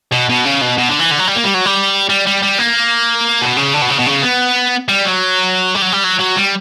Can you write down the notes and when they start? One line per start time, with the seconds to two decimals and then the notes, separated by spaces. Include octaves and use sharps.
0.12 B2
0.29 B2
0.45 C#3
0.61 B2
0.78 B2
0.89 D3
0.99 E3
1.11 D3
1.19 F#3
1.27 G3
1.36 A#3
1.44 G3
1.54 F#3
1.66 G3
2.09 G3
2.26 G3
2.43 G3
2.59 A#3
3.41 B2
3.57 C#3
3.74 D3
3.82 B2
3.90 C#3
3.99 B2
4.06 C#3
4.23 B3
4.89 G3
5.05 F#3
5.75 G3
5.82 F#3
5.93 G3
6.04 F#3
6.20 F#3
6.36 G3